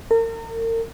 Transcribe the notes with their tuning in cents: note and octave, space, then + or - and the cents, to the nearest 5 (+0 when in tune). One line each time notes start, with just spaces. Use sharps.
A#4 -40